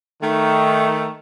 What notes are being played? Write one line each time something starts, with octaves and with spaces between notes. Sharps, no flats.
D#3 A3